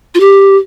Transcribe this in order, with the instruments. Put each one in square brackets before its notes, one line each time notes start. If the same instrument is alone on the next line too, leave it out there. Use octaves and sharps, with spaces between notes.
[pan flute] F4
G4